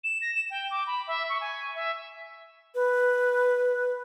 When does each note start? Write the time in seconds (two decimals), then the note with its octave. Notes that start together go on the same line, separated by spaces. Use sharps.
0.04 E7
0.22 A#6
0.35 E7
0.50 G5
0.71 D6
0.87 B5
1.07 E5
1.29 C#6
1.41 G#5
1.75 E5
2.75 B4